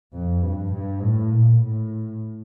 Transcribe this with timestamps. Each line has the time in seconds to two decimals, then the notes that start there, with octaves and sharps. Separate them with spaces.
0.13 F2
0.42 G2
0.72 G2
1.02 A2
1.31 A#2
1.61 A2